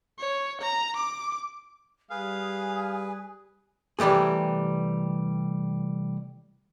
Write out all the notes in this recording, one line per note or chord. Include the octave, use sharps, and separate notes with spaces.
C#5
A#5
D6
G3 G#4 B4 F5 G#5 D#6
C3 E3 G3 A3 G#4